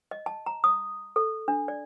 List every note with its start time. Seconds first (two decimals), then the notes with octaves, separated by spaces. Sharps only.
0.11 D#5
0.26 A5
0.46 A#5
0.64 D#6
1.16 A4
1.48 D4
1.68 D5